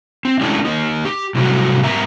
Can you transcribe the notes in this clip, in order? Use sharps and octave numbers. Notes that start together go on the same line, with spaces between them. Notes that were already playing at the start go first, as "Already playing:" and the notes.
C4
G#3 A3 C#4 D4 E4 G4
A#3 D#4
G4
A2 C3 F#3 G3 A3 F#4
G#2 B3 G4 A#4 E5 A#5